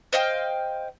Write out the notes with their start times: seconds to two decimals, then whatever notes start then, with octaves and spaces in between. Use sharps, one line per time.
0.13 C5 D#5 F5 G5